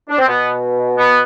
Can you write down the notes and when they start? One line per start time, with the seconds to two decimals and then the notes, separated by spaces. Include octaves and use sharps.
0.09 D4
0.19 C4
0.28 B2 B3
0.98 B3